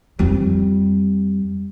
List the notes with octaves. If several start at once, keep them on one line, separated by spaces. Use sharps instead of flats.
F2 G3